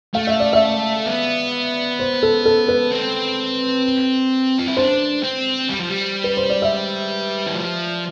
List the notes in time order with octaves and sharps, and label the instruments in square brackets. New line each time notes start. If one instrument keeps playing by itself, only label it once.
[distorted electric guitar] A3 [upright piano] F5
[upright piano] E5
D5
E5
[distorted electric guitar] B3
[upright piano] C5
A4
A4
B4
[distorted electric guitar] C4
F4
E4
[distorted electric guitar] D4 [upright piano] C5
[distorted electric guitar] C4
G3
F3
G3
[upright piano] B4
C5
D5
E5
[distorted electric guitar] E3
F3